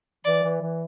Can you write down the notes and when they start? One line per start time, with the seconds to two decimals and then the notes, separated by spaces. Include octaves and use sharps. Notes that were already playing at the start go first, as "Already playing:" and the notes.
0.25 E3 D5
0.43 E3
0.62 E3